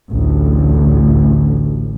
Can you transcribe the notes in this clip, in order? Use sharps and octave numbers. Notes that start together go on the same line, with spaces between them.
A1 D2